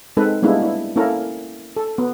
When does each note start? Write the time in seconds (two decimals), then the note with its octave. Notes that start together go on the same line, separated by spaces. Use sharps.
0.17 G#3 C4 D#4 A4 B4
0.42 G3 G#3 A#3 B3 D4 E4
0.63 E4
0.96 A#3 C#4 E4 A4 A#4
1.76 A4
1.98 B3